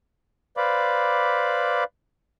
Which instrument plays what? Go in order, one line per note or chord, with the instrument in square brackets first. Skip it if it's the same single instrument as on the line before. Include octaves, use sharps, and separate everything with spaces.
[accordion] B4 C5 D5 F5 B5 D6